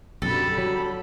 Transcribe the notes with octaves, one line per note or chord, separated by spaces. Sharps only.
B1 F#2 D3 G3 A4 B5
F#3